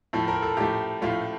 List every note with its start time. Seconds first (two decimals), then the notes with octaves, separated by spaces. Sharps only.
0.13 A2 F3 A3
0.28 A#4
0.42 A4
0.57 A2 F3 A3 G4
1.02 A2 F3 A3 F4